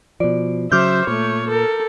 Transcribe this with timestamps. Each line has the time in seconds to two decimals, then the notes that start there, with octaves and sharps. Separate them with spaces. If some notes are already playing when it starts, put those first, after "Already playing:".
0.20 B2 F3 D5
0.72 C#3 F#3 C5 E5 D6 F6 G6
1.08 A#2 A3 C#5
1.49 A4 A#4